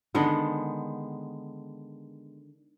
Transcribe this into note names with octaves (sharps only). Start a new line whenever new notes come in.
D3 D#3 G#3 B3